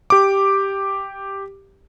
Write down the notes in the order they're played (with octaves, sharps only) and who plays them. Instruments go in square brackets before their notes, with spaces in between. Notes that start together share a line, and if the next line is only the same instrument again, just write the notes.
[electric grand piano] G4 D6